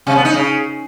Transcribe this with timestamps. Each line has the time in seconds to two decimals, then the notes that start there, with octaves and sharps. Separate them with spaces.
0.07 C3
0.16 B3
0.25 D#4
0.34 C#3